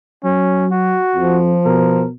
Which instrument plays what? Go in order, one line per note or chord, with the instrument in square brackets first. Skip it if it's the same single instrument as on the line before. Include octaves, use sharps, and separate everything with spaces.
[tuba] F#3 [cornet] C#4
[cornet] F#4
[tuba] F2 [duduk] F3
[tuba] B2 [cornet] A#4